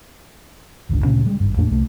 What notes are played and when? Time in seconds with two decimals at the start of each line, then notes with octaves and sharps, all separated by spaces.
0.89 D1 G1 C#2 D3
1.05 D2 A#2 C#3 C#4
1.26 G3 G#3
1.40 G#1 G2
1.57 E2 A2 A#3 D4
1.71 C2 A3